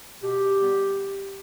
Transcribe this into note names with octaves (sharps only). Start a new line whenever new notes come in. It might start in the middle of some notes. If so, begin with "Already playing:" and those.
B2 G4
G3 B3